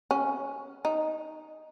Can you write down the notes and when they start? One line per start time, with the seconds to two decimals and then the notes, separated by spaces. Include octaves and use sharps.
0.11 C#4
0.85 D#4